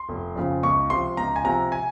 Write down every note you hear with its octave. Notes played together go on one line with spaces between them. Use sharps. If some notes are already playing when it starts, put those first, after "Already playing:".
Already playing: C6
F1
F2 C#3 F3
C#2 C#6
C3 F3 C6
C#2 A#5
G#5
C3 F3 A#5
G#5